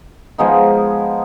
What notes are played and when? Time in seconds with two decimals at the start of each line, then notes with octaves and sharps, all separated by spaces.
0.38 F3 G#3 B3 D#4